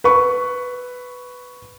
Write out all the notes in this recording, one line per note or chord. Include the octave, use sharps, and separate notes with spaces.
B4 C#6